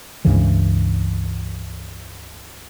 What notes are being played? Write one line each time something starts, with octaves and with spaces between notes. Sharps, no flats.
C#2 G2 C#3 E3